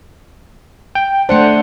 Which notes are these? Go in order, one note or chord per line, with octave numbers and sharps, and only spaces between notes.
G5
A3 D4 C5 F#5 C#7